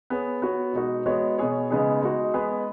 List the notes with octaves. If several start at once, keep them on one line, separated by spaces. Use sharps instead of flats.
B3 G#4 C#5
B3 F#4 C#5
B2 G#3 D#4 F#4
G#3 B3 F#4 C#5
B2 B3 G#4 C#5
C#3 G#3 B3 D#4 G#4
G#3 D#4 F#4
G#3 B3 G#4 B4